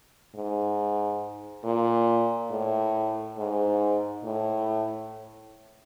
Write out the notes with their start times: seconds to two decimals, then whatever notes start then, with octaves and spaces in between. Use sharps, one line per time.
0.35 G#2
1.64 A#2
2.51 A2
3.37 G#2
4.24 A2